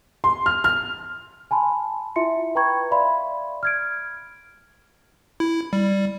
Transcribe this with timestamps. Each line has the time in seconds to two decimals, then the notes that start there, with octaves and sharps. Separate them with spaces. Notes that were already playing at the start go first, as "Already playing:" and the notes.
0.24 C6
0.46 F6
0.64 F6
1.51 G#5 A5 B5 C6
2.16 E4 F4 E5 C6 C#7
2.55 B4 G5 A#5 B5 C#6 G#6
2.91 D5 E5 F5 B5 C6
3.63 F6 G#6 D7
5.40 E4
5.73 G3